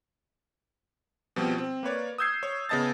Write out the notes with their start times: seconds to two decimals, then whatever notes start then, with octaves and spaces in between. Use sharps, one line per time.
1.36 B2 F3 G3 C4
1.58 C4
1.83 A#3 B4 C#5 D5
2.18 D#6 E6 G6 G#6 C7
2.43 C#5
2.69 C#3 B3 D#5 A5 A6